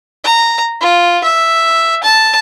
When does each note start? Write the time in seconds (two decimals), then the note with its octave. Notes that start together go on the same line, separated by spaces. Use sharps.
0.24 A#5
0.81 F4
1.24 E5
2.04 A5